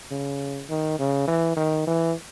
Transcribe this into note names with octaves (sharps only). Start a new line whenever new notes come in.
C#3
D#3
C#3
E3
D#3
E3